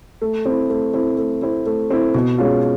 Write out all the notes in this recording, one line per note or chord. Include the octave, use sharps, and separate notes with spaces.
A3
C4 E4
A3
C4 E4
A3
C4 E4
A3
C4 E4
B2
G#3 C#4 F4